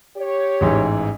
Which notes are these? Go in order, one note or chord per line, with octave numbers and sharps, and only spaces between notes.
G4 C#5
A1 G#2 E3